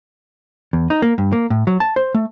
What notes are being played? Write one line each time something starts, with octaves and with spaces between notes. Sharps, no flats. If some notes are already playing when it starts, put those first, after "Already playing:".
E2
D#4
A#3
G2
A#3
A2
F#3
A5
C5
A3